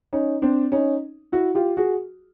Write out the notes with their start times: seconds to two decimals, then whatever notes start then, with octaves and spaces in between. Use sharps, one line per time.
0.13 C#4 D#4
0.42 C4 D4
0.72 C#4 D#4
1.32 E4 F#4
1.55 F4 G4
1.77 F#4 G#4